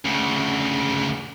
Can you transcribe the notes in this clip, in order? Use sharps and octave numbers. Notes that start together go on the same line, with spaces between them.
D2 C#3